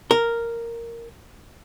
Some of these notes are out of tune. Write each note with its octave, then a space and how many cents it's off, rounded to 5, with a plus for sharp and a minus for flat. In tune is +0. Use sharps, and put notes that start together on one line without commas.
A#4 -5